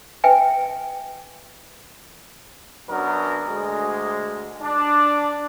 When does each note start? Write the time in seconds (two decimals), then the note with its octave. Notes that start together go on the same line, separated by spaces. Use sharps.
0.24 B4 E5 G5 G#5
2.88 F#2 F#3 B3 D4 A#4
3.46 D2 G#3
4.61 D4